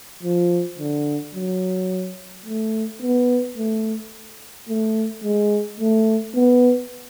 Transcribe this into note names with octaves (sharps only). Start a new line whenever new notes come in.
F3
D3
F#3
A3
B3
A3
A3
G#3
A3
B3